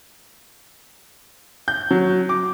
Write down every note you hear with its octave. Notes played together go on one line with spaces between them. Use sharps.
G6
F#3
D6